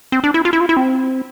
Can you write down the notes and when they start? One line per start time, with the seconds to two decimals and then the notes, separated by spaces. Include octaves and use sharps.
0.12 C4
0.24 D4
0.34 E4
0.45 F4
0.53 E4
0.60 F4
0.69 E4
0.77 C4